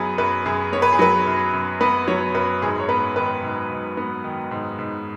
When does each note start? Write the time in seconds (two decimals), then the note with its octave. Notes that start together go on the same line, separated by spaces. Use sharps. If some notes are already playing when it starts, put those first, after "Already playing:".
Already playing: F#2 F#3 B3 G#4 B4
0.18 F#2 B4
0.45 F#2 G#4
0.73 B3 C#5
0.82 B4
0.93 G#4
0.99 F#3 B4
1.27 F#2
1.53 F#2
1.81 B3 B4
2.08 F#3 C#5
2.34 F#2 B4
2.62 G#2 G#4
2.80 C#5
2.89 B3 B4
3.16 D#3 B4
3.43 G#2
3.71 G#2
3.97 B3
4.24 D#3
4.51 G#2
4.79 G#2